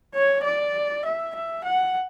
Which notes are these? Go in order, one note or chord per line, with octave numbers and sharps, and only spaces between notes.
C#5
D5
E5
E5
F#5